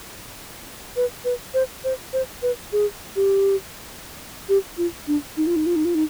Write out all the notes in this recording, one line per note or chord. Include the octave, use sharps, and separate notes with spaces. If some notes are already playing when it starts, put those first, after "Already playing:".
B4
B4
C5
C5
C5
B4
G#4
G4
G4
F4
D4
D#4
F4
D#4
F4
D#4
F4
D#4